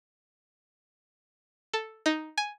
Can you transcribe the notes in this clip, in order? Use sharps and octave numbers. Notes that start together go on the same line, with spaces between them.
A4
D#4
G#5